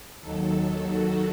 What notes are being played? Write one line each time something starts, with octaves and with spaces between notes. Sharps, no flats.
D#2 D#3 F#3 A4
F#4